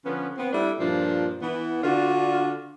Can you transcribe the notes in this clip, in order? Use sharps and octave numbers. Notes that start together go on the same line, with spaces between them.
D3 F3 B3 C#4 B4
B3 C4
G3 A3 D4 E4
G2 A#2 F3 D4
E3 B3
D3 D4 F4 F#4